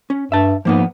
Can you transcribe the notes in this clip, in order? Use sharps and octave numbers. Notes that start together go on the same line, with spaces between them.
C#4
G2 E5 A5
G#2 F3 A#3 B3